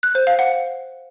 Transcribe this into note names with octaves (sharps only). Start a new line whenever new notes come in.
F#6
C5
F5
F#5